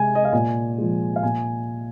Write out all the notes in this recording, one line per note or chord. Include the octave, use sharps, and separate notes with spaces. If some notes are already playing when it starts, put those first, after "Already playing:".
Already playing: C3 G#3 G#5
D#5
F5
A#2 G#5
F3 G#3
F5
A#2 G#5